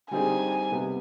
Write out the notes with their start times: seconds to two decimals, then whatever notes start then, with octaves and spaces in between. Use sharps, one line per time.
0.11 D3 G3 C4 D#4 G#4 G#5
0.71 C3 G3 B3